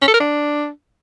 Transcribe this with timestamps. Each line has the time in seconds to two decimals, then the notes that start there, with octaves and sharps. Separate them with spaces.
0.02 C#4
0.08 A4
0.14 A#4
0.20 D4